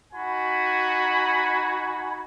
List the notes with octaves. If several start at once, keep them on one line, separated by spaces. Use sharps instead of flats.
D#4 F#4 G#5 B5